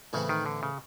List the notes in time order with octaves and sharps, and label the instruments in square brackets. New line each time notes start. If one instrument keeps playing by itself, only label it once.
[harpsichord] A2 E3 A3 C4 E4 [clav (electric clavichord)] C#3
[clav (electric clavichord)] D#3
D3
C#3